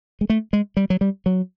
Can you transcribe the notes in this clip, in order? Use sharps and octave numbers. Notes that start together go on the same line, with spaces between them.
G#3
A3
G#3
G3
F#3
G3
F#3